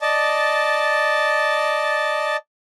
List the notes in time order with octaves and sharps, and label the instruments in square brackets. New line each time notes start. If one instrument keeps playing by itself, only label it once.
[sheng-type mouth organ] D5 D#5 A5